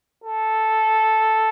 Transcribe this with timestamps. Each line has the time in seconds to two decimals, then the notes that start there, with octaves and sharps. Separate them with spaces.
0.24 A4